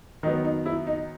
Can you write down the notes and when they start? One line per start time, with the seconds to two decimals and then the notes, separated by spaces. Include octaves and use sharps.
0.23 D#3 F#3 B3 D#4
0.45 D#4
0.66 E4
0.87 D#4